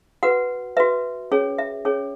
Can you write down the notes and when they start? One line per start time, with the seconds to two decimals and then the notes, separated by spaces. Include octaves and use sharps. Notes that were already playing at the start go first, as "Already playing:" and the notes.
0.23 F#4 B4 F#5
0.77 F#4 B4 E5
1.32 C#4 G#4 C#5
1.58 E5
1.85 C#4 G#4 C#5